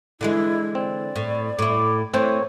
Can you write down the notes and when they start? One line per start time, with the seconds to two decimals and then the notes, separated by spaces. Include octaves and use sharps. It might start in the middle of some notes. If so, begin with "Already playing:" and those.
0.21 D3 E3 G#3 E4
0.75 C4 D5
1.16 A2
1.59 A2 E4 D6
2.14 E3 A3 C4 C5 C#5